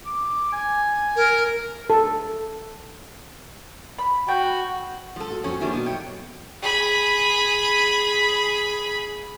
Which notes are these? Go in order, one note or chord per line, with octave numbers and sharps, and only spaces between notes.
D6
G#5
A#4
A4
B5
F#4 G5
F3 G#3 A4
A3 F#4
F2 F3 C4 C#4 F#4
D#3 G3 A#3 D4 E4
B2 B3
F#2 C#5 G5
G#4 B5